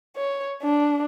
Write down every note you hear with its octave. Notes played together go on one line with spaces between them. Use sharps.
C#5
D4